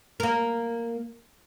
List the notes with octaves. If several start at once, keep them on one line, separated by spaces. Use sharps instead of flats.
A#3 A#4